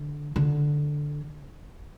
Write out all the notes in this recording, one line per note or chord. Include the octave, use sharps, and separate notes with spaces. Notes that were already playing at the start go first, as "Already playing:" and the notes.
Already playing: D3
D3